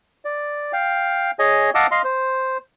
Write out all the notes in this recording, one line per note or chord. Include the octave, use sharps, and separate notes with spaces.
D5
F5 G5
G#4 C#5 D#5 G#5
D#5 F5 F#5 A5 D6 E6
D#5 F5 C6
C5